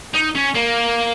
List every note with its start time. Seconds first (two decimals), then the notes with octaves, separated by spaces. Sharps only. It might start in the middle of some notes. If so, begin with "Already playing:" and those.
0.14 D#4
0.35 C#4
0.55 A#3